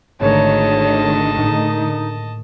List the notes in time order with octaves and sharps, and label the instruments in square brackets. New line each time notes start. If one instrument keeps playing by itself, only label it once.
[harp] G#1 A#5 [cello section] D3 D#3 A3 [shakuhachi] C#5 [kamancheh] D#5 A5
[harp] A2 A#3 [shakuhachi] D#4